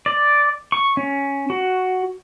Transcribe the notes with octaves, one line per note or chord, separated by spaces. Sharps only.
D5
C#6
C#4
F#4